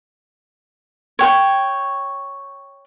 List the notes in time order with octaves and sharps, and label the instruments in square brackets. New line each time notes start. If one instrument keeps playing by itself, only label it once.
[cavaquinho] C#5 G5